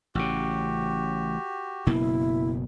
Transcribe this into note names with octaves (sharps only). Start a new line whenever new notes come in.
A1 C#3 F#4 G4
F#1 B2 A#3 E4